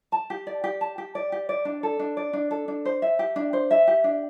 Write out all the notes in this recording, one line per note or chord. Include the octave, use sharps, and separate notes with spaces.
A5
G4
D5
G4
A5
G4
D5
G4
D5
D4
A4
D4
D5
D4
A4
D4
C5
E5
G4
D4
C5
E5
G4
D4